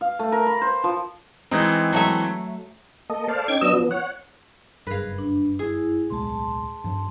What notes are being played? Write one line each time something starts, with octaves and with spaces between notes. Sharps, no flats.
F5
A3
A#4
B5
C5
F3
E3 G#3 C4 D#4
F#3 A3 E5
A#3 A4 D#5
A4 C5 D5 F5
C#4 D#4 G5 D6 G#6
F#3 B3 D4 D#5 E6
F3 B3
C#5 F#5
F#1 G2 G#4 A#4 B4 F5
D4
E4 G#4
D1 B1 G#3 A5 C6
G2 F3